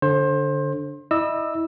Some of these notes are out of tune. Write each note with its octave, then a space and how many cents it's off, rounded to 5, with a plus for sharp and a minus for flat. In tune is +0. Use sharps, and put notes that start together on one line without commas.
D3 -5 C5 +25
E4 -25 D#5 -35 E6 +0